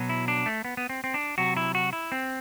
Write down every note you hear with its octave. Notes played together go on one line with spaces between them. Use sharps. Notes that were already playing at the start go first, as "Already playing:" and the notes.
Already playing: B2 F#3
E4
D4
A3
B3
B3
C4
C4
D4
C3 F#3 F#4
E4
F#4
E4
C4